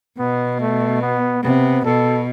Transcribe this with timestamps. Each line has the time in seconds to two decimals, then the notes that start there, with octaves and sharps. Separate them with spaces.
0.18 B2 B3
0.60 A3
1.01 B3
1.43 C3 B3
1.85 B2 A4